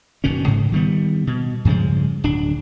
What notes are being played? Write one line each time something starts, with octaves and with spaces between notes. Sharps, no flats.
F#1 B2 D#3 C#4
G#2 C#3
D#3 G3 B3
B2
G2 C#3 F3 G#3
D1 D4